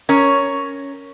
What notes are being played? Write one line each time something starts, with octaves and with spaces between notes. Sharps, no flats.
C#4 A#4 C#5